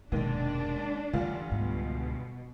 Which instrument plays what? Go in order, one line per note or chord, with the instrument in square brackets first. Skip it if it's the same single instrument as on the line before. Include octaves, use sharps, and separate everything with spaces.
[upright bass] F1 B2 [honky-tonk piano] D#2 G#2 [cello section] D4
[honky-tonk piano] D2 G2 F4 [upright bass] E3 F3
[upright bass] C#2 G#2 [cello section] B2